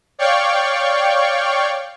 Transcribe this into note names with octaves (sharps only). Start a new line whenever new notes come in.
C#5 D5 F5 G5 C#6